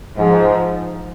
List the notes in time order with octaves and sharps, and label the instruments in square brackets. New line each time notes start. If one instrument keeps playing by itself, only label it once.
[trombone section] G#2 [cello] F3